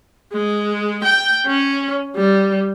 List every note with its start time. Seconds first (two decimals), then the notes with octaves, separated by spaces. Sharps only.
0.33 G#3
1.04 G5
1.47 C#4
2.16 G3